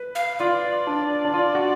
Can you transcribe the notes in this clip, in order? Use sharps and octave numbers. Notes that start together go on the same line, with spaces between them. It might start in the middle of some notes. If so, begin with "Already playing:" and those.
Already playing: B4
F5
F4 D5
D4
D4
F4
F#4